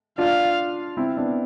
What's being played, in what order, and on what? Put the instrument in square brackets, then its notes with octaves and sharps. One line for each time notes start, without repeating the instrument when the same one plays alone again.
[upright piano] D4 F4 [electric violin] F5
[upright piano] C4 E4
B3 D4